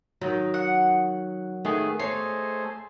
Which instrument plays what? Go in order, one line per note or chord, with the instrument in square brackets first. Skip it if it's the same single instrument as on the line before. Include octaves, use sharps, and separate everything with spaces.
[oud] D#3 [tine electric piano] F#3
[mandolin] F#5
[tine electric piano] D#3 A3 G#4 [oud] B3
[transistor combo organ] A3 G#4 C5 [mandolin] D#4 [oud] C#5 [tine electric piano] C7